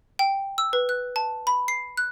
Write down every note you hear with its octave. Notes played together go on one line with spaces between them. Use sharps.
G5
E6
B4
F#6
A5
B5
C7
F#6